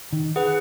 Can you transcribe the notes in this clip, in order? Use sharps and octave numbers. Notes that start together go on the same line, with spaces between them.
D#3
G#4 B4 F#5